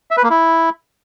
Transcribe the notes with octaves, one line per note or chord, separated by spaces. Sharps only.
E5
B4
A#3
E4